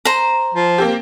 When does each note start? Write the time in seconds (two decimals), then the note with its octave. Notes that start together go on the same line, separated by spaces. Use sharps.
0.05 C5 A#5
0.54 F3
0.78 A#3 C4 G4